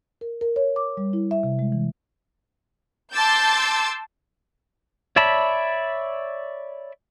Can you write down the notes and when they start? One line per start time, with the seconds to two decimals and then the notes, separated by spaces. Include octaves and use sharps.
0.21 A#4
0.41 A#4
0.56 C#5
0.76 D6
0.97 G3
1.13 E4
1.31 E5
1.43 C3
1.59 G#3
1.72 E3
3.13 A5 C6 D6 E6 G6 A6
5.16 C#5 D5 E5 A5 B5